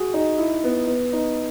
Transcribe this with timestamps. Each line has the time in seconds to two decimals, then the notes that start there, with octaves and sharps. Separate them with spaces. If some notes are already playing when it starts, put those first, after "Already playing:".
Already playing: F#4 G#4
0.14 D#4
0.38 E4
0.64 B3
0.88 B3
1.13 D#4